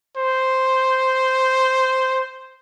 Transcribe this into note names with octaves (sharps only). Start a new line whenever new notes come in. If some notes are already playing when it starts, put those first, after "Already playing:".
C5